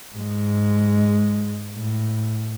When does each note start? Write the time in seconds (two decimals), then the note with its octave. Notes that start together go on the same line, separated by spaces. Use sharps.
0.16 G#2 G#3
1.77 A2